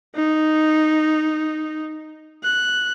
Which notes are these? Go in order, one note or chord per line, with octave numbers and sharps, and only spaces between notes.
D#4
F#6